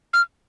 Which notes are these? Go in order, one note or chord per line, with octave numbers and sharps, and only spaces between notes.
F6